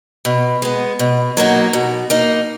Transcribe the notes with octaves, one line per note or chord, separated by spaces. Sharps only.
B2
G#3 B3
B2
F#3 A#3 D#4 F#4
B2
A#3 D#4